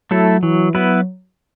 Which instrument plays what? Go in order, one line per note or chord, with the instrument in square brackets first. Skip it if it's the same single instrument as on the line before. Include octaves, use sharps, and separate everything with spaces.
[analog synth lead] F#3 [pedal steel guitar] A3 E4 A4
[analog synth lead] E3 [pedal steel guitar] F#3
[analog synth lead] F#3 [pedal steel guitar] B3 E4 B4